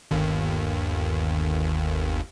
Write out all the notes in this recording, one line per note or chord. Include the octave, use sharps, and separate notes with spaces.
G1 D#2